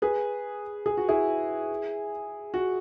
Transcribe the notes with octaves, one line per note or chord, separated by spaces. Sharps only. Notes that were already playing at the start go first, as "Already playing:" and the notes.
G#4 B4
G#4
F#4
E4 G#4
F#4